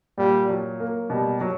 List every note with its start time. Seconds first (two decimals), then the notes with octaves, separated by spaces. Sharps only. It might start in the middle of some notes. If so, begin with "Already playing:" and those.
0.18 A#2 G3
0.49 F#3
0.80 A#3
1.10 B2 G3
1.41 F#3